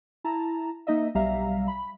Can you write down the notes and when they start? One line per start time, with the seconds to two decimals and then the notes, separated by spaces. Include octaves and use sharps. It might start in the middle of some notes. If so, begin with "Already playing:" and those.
0.24 E4 A5 A#5
0.87 A#3 D#4 D#5 E5
1.15 B1 G3 E5 F5 A#5
1.68 B5